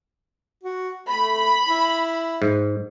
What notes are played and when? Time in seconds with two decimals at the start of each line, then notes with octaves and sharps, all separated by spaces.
0.64 F#4
1.08 A3 B5
1.69 E4
2.42 G#2